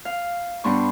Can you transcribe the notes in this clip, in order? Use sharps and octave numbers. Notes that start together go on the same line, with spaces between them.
F5
G2 B3 D4 C6 C#6